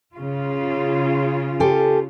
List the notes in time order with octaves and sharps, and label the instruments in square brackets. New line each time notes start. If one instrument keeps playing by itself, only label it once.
[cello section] C#3 F4
[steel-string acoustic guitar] G4 A4 G#5